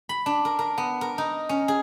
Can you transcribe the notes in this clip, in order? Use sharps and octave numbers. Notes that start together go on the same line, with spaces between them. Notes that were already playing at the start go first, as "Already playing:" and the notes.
B5
D4
A#4
A#4
B3
A#4
D#4
C#4
G#4